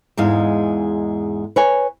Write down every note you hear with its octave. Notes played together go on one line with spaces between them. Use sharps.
E2 G#2 G#3 F5
B4 C#5 G#5